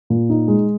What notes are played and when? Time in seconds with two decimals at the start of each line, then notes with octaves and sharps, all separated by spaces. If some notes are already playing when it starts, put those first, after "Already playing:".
0.10 A#2
0.30 D#4
0.48 G#3